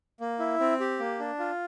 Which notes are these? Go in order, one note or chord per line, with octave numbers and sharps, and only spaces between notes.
A#3
E4
C4
G4
A#3
D4
F4